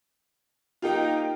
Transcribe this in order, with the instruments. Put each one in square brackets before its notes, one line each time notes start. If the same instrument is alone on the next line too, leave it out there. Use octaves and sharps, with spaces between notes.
[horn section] A#3 D#4 [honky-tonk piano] F4 G4 G5